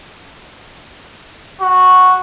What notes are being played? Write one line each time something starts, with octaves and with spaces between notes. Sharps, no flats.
F#4